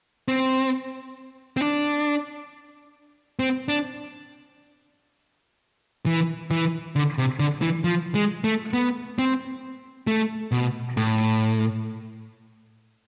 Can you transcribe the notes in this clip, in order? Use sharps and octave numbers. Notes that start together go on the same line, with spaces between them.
C4
C4
D4
C4
D4
E3
E3
D3
C3
D3
E3
F3
G#3
A3
B3
C4
A3
B2
A2